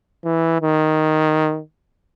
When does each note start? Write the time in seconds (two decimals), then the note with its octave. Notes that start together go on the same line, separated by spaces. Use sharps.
0.25 E3
0.62 D#3